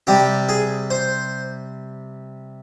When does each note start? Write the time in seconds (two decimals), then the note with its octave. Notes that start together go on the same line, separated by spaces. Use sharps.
0.07 C3 G3 G4
0.49 G#4
0.90 C5